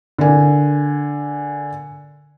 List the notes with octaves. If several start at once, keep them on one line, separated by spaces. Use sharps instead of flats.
D3 A#4 G#5